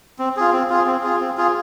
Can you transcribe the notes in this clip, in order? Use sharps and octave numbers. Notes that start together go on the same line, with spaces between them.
C4
F4 G#4
C4
F4 G#4
C4
F4 G#4
C4
F4 G#4